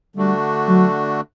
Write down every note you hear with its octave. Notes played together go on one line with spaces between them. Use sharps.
D3 G3 A3 D4 F#4
F#3